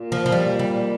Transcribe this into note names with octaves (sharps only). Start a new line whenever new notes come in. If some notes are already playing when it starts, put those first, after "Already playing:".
Already playing: A#2
F3
F3
G3
G3